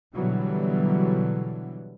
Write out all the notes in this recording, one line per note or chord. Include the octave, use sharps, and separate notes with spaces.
B2 D3 E3 F#3 G3 B3